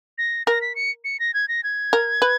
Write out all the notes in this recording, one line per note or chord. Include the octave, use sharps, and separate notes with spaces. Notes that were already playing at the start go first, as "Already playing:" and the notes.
A#6
A#4 A#6
B6
C#7
C#7
A#6
G#6
A#6
G#6
A#4
B4